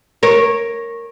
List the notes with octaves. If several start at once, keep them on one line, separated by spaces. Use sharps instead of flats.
A#4 C#5